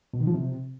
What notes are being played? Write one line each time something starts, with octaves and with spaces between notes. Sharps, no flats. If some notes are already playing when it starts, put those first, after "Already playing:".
B2
D#3
F3
C3